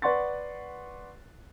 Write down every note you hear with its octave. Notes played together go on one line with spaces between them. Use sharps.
B4 D5 F#5 C6 C#6 A6